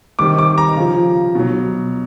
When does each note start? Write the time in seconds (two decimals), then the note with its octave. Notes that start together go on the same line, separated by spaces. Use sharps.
0.19 C3 D#3 G3 D6
0.38 D6
0.58 A#5
0.76 C#3 F3
1.35 B2 F#3